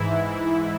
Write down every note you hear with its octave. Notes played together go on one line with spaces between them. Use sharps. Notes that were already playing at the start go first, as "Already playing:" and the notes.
Already playing: G#2 E3 E4